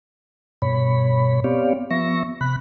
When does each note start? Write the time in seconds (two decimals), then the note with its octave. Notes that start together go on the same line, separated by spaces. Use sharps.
0.62 G2 B2 C#5 B5
1.44 B3 C4 G4 C#5 D5 F5
1.91 F3 B3 E5 C#6 A#6
2.41 C3 B5 F#6